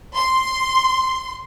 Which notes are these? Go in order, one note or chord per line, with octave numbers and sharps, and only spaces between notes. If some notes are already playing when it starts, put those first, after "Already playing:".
C6